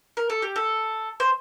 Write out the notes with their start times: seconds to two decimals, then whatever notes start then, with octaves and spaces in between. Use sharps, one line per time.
0.17 A#4
0.30 A4
0.42 G4
0.56 A4
1.20 C5